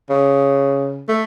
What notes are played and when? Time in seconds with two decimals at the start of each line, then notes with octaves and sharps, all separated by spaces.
0.10 C#3
1.08 A3